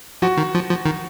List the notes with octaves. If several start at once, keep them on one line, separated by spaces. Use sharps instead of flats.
F3 F#4
D#3
F3
F3
D#3